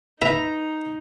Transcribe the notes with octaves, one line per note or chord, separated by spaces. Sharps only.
D#4 B4 E5 A#5